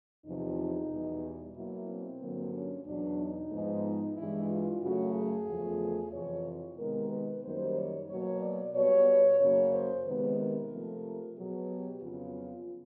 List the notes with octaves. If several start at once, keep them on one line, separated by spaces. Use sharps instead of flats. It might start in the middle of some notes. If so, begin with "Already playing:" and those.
E2 C3 F3 D#4
E2 B2 G3
B2 F#3 A#3 E4
C4
G2 D3 F#3 A#3
C#4
E2 B2 F#3 D4
D#4
G#2 F3 G#3 B3
G2 E3 G#3 E4
F4
F#2 C#3 F#3 A3 F#4
G#4
E2 C#3 F3 A3
F2 C3 E3 C#5
C3 D#3 G#3 B3 A#4
B4
F#2 D#3 G3 A#3 C5
C#5
B2 F#3 A#3 C#5
D5
B2 G3 B3 C#5
F#2 C#3 F#3 A#3 C#5
C5
C3 D#3 G#3 B3 B4
A#4
C3 F3 A3
B2 F#3 B3 G#4
G4
F2 C#3 F#3 B3 F4